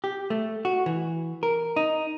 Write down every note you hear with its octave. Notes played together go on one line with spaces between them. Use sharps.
G4
A3
F#4
E3
A#4
D#4